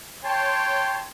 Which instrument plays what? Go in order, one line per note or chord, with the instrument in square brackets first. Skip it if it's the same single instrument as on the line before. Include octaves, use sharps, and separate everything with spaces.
[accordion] C#5 A5 C6 [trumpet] G5